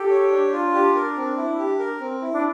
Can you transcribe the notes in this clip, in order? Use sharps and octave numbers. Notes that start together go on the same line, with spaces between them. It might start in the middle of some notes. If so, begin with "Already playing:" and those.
Already playing: G4 A4
C#5
D4
F4
D4 G4
A#4
C4
E4
G4
A#4
C4
E4
D4